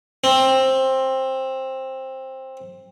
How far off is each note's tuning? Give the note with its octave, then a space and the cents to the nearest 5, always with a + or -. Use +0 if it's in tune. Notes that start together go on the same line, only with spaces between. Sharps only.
C4 +15